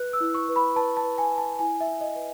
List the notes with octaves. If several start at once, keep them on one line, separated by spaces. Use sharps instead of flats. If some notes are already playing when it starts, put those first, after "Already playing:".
Already playing: B4 F#6
E6
E4
C#6
B4
B5
B4 A5
A5
B4
G#5
B4
A5
E4 G#5
E5
E4
D#5
B4